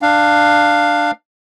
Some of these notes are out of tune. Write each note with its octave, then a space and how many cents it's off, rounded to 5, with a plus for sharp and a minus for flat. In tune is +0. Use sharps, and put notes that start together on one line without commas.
D4 +15 F5 +0